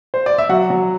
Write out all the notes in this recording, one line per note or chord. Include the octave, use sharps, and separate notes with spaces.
C5
D5
E5
F#3 F#4 F#5
F#3